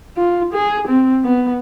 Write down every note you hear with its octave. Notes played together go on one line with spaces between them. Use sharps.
F4
G#4
C4
B3